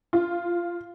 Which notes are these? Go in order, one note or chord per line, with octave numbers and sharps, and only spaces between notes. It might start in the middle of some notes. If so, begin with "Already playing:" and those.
F4